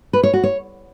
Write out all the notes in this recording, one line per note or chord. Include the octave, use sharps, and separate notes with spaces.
B4
C#5
F#4
C#5